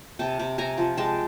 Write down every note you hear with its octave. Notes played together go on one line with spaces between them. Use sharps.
C3 G5 A5
C3
C3 G#5 A#5
F3
G#3 G5 A5